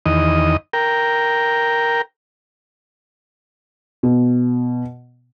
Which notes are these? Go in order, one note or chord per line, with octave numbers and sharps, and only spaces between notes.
E2 D#3 D#5
A#4 G5
B2